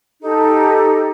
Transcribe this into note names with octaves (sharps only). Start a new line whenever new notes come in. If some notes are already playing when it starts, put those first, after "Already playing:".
D#4 G4 A4